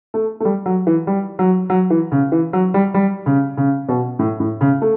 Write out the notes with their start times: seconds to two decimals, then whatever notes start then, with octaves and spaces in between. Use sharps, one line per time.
0.14 A3
0.40 A3
0.45 G3
0.66 F#3
0.87 E3
1.07 G3
1.39 F#3
1.70 F#3
1.90 E3
2.12 C#3
2.32 E3
2.53 F#3
2.74 G3
2.94 G3
3.26 C#3
3.57 C#3
3.89 B2
4.19 A2
4.40 A2
4.61 C#3
4.82 A3